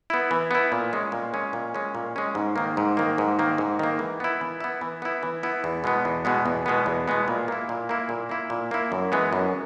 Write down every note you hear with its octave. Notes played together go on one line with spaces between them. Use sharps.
B3 E4
E3
B3 E4
A#2
G#3 C#4
A#2
G#3 C#4
A#2
G#3 C#4
A#2
G#3 C#4
G#2
D#3 A#3
G#2
D#3 A#3
G#2
D#3 A#3
G#2
D#3 A#3
E3
B3 E4
E3
B3 E4
E3
B3 E4
E3
B3 E4
E2
B2 G#3 B3
E2
B2 G#3 B3
E2
B2 G#3 B3
E2
B2 G#3 B3
A#2
A#3 E4
A#2
A#3 E4
A#2
A#3 E4
A#2
A#3 E4
F#2
E3 G#3 B3
F#2